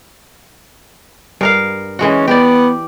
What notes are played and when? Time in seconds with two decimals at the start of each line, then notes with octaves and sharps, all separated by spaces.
1.41 G2 A#4 F5
1.99 E3 G#3 C#4 F#4
2.28 B3 G4 D5